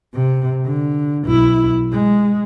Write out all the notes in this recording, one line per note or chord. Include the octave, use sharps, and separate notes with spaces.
C3
D3
B1 E4
G#3